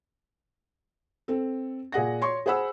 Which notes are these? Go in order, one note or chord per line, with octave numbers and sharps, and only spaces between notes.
C4 A4
A#2 G#4 F#5 A#6
C#5 C6 C#6
G#4 C5 F#5 B5 E6